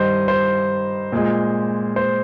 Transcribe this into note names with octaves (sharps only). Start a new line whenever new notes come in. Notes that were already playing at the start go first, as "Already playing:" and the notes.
Already playing: G2 D#3 G3 C5 D#5
C5
A#2 G#3
C5